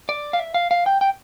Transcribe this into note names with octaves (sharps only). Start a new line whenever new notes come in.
D5
F5
E5
F5
F5
G5
G5